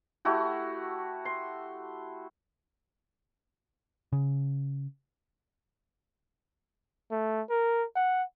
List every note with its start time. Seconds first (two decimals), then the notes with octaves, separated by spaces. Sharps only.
0.25 A3 E4 F#4 G4
1.25 C6
4.13 C#3
7.11 A3
7.50 A#4
7.96 F#5